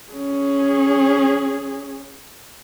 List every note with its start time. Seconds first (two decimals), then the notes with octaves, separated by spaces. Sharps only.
0.13 C#4 G#4